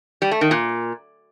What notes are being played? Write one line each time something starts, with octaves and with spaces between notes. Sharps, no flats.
G3
A3
D#3
A#2